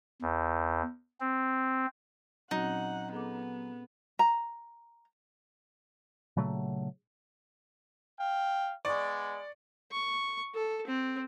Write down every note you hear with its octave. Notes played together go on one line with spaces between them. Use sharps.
E2
C4
A#2 F#3 C4 C#4 D#4 F#5
B3 G#4 A4 D6
A#5
A#2 C#3 F#3 A3
F5 G5
G#3 B3 D5 C#6
C#6
A4
C4